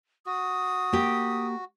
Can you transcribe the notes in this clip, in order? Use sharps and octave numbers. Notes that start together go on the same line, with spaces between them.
F#4 D#6
A#3 G4